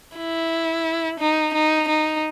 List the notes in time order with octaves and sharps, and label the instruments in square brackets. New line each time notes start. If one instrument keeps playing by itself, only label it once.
[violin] E4
D#4
D#4
D#4